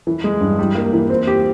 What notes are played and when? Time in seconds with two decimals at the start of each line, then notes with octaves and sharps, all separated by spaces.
0.07 E3
0.24 G#3
0.41 G2
0.59 G3
0.75 A#3
0.93 E3
1.10 C4
1.27 G4